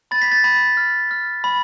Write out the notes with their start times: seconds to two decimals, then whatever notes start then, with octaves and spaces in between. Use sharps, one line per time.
0.11 B5 A6
0.22 B6
0.32 A6
0.44 B5
0.77 F6
1.11 F6
1.44 B5